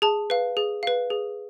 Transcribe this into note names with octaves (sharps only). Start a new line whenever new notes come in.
G#4 A5
B4 F5
G#4
B4 F5
G#4